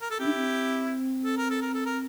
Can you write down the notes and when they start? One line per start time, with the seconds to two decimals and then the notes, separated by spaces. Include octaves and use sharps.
0.01 A#4
0.10 A4
0.19 C4 E4 G4
0.26 D4
0.35 C4
1.25 A4
1.37 A#4
1.50 A4
1.62 A#4
1.74 A4
1.86 A#4